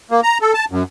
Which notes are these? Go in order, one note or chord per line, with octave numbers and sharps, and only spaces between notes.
A#3
A#5
A4
A5
F#2